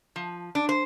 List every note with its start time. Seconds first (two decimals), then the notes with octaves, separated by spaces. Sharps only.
0.16 F3
0.55 D4
0.69 C5